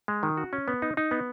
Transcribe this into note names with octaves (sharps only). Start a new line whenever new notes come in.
G#3
D#3
F#4
C#4
B3
D#4
D#4
B3